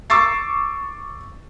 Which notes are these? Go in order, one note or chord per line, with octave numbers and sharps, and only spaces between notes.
C#6 D6 E6 A6 C7